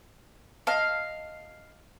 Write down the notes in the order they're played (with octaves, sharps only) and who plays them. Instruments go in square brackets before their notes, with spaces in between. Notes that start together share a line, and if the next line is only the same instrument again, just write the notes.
[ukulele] D#5 A5 [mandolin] F5